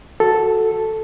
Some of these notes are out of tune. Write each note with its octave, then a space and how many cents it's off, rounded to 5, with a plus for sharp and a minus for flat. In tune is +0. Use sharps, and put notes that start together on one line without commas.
F#4 +0 A4 +0